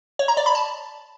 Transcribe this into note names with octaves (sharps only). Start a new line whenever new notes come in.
C#5
A#5
D5
B5
A5